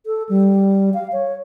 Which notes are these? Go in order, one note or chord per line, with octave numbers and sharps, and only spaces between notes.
A4
G3
F5
C#5